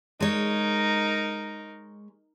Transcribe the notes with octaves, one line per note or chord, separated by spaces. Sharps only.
G#3 D#4 A#4 C#5